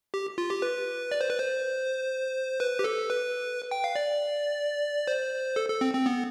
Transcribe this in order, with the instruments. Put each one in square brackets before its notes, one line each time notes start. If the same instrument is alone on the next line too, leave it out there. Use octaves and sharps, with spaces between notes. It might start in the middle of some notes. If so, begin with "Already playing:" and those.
[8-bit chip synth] G4
F4
G4
B4
D5
C5
B4
C5
B4
G4
A4
B4
G5
F5
D5
C5
A4
A4
C4
C4
B3